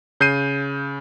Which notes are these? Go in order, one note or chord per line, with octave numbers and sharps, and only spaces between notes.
C#3 G6 C7 D#7